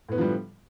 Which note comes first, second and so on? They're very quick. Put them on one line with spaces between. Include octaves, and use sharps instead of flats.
A2 B3 D3 F3 G3